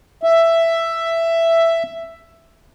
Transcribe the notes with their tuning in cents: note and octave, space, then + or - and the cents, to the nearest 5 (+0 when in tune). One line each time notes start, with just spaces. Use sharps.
E5 +10